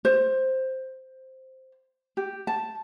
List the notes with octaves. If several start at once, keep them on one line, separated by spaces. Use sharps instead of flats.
C5
G4
A5